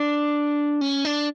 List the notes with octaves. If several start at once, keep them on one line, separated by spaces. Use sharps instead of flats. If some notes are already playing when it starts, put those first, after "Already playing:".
Already playing: D4
C#4
D4